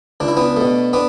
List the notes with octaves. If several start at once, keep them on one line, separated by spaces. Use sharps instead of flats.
C#2 D4
E4
B3 D4
B2 A3
B3 D4